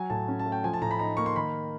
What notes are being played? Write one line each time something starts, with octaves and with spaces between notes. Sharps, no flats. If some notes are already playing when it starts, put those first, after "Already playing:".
Already playing: F#3 G#5
A2 A5
C#4
A5
A3
G5
F3 G#5
A5
A2 A#5
B5
D#4 A#5
A#3 C#6
C6
D#3 B5